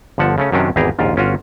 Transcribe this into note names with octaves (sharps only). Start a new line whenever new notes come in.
G1 D3 F3 F#5 A5
C#3 A3 C#4
F#2 C3 D#3 F#3 C#4 D4
G#1 E2 E3 G4 G#4 A#5
A#1 D#2 G#2 F4
G1 C#4 F4 F#4